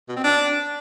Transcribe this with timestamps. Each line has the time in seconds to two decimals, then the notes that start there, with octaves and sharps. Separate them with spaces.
0.09 B2
0.17 C4
0.24 D4